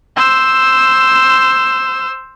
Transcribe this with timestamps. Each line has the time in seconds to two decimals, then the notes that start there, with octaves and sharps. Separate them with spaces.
0.16 C5 E6